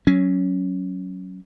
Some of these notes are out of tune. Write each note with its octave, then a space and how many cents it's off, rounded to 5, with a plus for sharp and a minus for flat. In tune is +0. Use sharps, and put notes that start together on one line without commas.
F#3 +10 C#4 +0